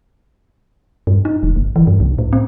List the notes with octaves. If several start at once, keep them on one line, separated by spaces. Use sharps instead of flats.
G2
D#4
E1
G1
E3
G2
C2
A2
C4